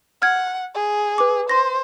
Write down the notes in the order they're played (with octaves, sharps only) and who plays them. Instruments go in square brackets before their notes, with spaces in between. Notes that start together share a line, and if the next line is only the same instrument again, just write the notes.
[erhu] F#5 [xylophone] F6 G#6
[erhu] G#4
[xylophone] B4 D6
[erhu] C5 [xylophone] C6 A#6